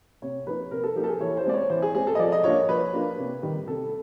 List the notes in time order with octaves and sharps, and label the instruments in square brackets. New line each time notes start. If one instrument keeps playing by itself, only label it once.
[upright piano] C3 C#5
F3 A#3 D#4 B4
C3 A#4
A4
F3 A#3 D#4 G4
A4
G#4
E3 C#5
C5
G#3 C4 D5
C#5
E3 C5
G#4
G#3 C4 G#4
A4
D#5
F3 D5
D#5
A#3 D4 F4 C#5
F3 B4
A#3 D4 F4
C3
D#3 G3
C3 A4